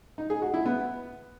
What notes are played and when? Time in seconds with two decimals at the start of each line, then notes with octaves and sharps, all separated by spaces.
0.18 D#4
0.30 G#4
0.42 F#4
0.54 E4
0.66 B3